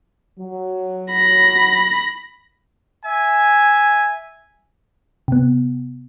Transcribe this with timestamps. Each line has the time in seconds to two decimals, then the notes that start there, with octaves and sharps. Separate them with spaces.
0.40 F#3
1.12 B5 A#6
3.05 E5 G#5
5.28 C3 B3